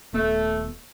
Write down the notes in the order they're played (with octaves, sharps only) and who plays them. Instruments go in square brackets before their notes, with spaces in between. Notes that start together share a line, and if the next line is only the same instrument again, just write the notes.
[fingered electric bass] D#1 B3 [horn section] A3